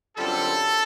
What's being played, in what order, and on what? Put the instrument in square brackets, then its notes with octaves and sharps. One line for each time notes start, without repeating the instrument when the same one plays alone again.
[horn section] F#2 D3 G3 C4 F4 A4